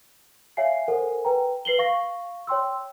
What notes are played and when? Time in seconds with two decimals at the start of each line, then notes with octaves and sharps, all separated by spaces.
0.57 C#5 E5 F5 G#5 C7
0.88 A4 A#4 C5 F#5 G#5
1.25 B4 G5 A#5
1.65 B4 C7 F#7 G7
1.79 F5 C#6 A#6
2.47 C#5 G5 C6 E6